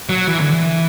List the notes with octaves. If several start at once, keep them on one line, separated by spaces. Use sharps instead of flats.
F#3
E3
D3
E3